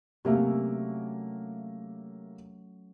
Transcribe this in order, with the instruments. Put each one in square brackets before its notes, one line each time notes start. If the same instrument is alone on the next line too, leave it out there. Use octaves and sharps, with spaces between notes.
[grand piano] C3 A#3 E5 [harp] F#3 A3 C#4